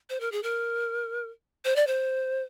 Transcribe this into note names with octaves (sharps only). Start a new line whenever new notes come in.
C5
A#4
G#4
A#4
C5
D5
C5